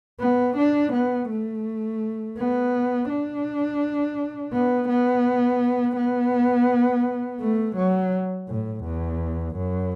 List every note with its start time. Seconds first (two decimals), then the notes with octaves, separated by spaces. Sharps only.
0.20 B3
0.57 D4
0.93 B3
1.29 A3
2.37 B3
3.09 D4
4.53 B3
4.89 B3
5.96 B3
7.40 A3
7.76 F#3
8.48 A2
8.84 E2
9.56 F#2